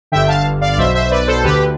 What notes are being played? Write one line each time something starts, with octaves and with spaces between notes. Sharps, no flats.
G1 G2 D3 E5 G5
F5 A5
D5 F5
D5
B1 B2 C5 E5
C5 E5
B4 D5
A4 C5
D2 D3 G4 B4